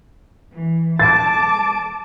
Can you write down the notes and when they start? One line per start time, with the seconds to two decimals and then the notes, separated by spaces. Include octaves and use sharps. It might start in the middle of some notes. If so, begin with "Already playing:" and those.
0.53 E3
0.99 A5 D6 A6